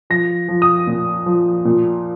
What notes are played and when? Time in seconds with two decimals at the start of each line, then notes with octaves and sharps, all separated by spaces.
0.10 F3 A#6
0.48 F3
0.62 D#6
0.87 A#2
1.26 F3
1.65 A#2